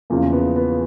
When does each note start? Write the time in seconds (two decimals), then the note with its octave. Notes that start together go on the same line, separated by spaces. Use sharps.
0.10 E2 C#3 F3 A#3
0.33 B3
0.56 B3